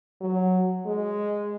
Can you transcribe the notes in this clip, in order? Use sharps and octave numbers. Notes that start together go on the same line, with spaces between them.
F#3
G#3